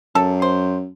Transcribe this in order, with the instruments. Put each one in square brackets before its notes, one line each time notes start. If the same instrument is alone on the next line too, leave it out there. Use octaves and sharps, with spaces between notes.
[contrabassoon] F#2 [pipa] A4
[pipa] C5